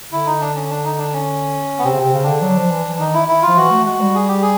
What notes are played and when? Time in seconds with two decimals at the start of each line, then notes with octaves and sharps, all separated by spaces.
0.12 D3 E4
0.26 D#4
0.41 D4
0.55 C#4
0.70 D4
0.84 D#4
0.98 D4
1.13 C#4
1.79 B3
1.84 C3 C4
1.93 C#3
1.99 C3 C4
2.13 C#3
2.23 D3 D4
2.42 F#3
2.56 F3
2.71 E3
2.85 E3
3.00 D#3 D#4
3.14 E4
3.28 E4
3.42 F4
3.48 F3
3.57 E3 F#4
3.71 A3
3.86 G#3 F#4
4.01 G3
4.15 G#4
4.28 G4
4.42 G#4